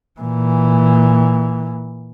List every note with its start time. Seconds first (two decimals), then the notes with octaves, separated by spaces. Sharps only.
0.20 A#2 E3